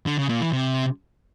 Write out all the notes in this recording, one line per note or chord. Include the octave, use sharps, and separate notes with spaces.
D3
C#3
A#2
E3
C3